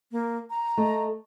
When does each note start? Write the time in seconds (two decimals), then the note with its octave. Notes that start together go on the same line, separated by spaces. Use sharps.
0.12 A#3
0.50 A#5
0.77 A3 D#5